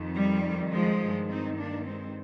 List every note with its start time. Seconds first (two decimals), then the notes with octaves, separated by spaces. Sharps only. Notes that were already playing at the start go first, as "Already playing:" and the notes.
Already playing: F2 D#3
0.15 G3
0.71 F3 G#3
1.01 G2 D#3
1.28 C4 D#4
1.57 A#3 D4
1.86 G#3 C4